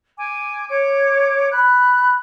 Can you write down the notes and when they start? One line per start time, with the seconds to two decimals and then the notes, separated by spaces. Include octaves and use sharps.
0.18 G#5 D6
0.68 C#5 D6
1.51 B5 F#6